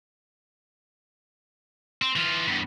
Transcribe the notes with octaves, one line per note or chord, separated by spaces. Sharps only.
C4
E3 F4
E2 G2